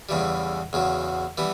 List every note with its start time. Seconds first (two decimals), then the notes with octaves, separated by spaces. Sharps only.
0.09 E2 C#3 E3 G3
0.73 E2 C#3 F#3
1.38 E3 G3 B3